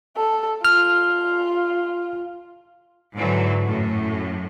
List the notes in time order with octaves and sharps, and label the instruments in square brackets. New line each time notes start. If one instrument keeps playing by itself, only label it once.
[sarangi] A4
[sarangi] F4 [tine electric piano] F6
[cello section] G#2 D3 E3 F#3
F#2 A2